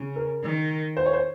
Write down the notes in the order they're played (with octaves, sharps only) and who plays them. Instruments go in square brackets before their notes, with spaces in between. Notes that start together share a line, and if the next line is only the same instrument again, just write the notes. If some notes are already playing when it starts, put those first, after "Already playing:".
Already playing: [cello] C#3
[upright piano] A#4
[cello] D#3
[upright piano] C5
C#5
C5